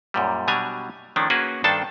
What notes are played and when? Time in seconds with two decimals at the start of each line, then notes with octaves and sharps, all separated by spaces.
0.14 F#2 A#2 G3
0.48 B2 F#3 G3 D4 G#5 A#5
1.16 D#3 F3 A3 C#4 D4
1.30 A#3 C#4 F#4 G#4 A#4 B4
1.64 G2 D#3 D4 A4 C5 A5